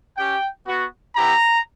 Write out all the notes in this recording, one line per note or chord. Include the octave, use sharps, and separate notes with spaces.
C#4 G4 G5
B3 F#4
B3 E4 G4 A#5